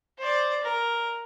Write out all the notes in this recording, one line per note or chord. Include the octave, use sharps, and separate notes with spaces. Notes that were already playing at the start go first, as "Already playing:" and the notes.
C5 D5
A#4